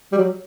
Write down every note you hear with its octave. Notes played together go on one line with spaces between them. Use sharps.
G3
F#3